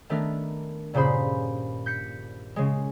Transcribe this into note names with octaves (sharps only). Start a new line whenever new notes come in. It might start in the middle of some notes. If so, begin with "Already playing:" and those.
D#3 A3 B3 D4 A#4
G2 A#2 C#3 G#4 C5 B5
G6 B6 C#7
C#3 G#3